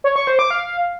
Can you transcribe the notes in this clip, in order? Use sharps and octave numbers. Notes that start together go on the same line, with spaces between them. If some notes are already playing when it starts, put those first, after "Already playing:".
C#5
C#6
C5
D6
F5